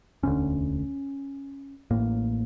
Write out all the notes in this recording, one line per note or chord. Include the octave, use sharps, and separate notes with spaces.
E1 D2 D3 C#4
A1 A2 A#3